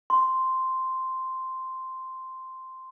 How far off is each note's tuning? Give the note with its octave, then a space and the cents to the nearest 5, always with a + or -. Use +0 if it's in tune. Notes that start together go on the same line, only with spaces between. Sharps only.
C6 -5